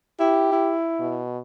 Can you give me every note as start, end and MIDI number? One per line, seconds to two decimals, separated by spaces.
0.20 0.49 64
0.20 0.76 67
0.52 1.22 64
1.00 1.39 47